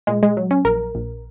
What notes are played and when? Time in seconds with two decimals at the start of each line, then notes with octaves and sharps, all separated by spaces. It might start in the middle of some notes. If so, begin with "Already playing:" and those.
0.07 A#2 G#3
0.23 G#3
0.37 F#3
0.51 C#4
0.65 A#1 A#4
0.95 A#1